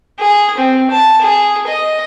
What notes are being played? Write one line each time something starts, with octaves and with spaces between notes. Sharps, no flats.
G#4
C4
A5
G#4
D#5